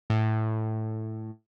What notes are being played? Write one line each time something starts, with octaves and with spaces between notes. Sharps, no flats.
A2